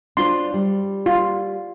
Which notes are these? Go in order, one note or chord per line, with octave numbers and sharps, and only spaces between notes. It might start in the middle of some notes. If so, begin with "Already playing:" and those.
D4 F4 C5 C6
G3
F4